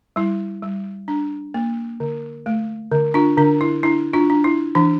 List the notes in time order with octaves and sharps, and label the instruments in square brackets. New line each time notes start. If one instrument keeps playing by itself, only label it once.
[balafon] G3 E4
G3
D4
A#3
D3
A3
D3
D4 F4
D3 D4
E4
D4 E4
D4 F4
D4
E4
E3 D4